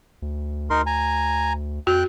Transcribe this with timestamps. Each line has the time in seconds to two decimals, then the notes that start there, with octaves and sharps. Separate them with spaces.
0.22 D2
0.70 D2 D#4 A#4 C6
0.86 G#5 A#5
1.87 F2 F#4 G5 F#6